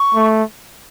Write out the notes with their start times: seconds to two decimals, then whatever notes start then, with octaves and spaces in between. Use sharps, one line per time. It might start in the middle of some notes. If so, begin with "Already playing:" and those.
Already playing: C#6
0.14 A3